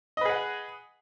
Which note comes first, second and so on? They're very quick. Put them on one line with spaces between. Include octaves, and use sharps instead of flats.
D#5 B4 G#4 F#5